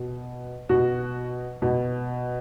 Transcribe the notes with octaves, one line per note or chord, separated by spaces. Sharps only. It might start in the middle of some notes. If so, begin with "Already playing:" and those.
Already playing: B2
B2 F#4
B2